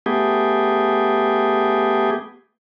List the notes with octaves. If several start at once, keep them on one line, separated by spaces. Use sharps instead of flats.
A3 B3 G4 G#4